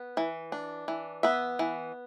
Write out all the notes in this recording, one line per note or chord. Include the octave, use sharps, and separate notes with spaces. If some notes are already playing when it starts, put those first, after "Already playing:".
Already playing: B3
E3
D4
E3
B3 E5
E3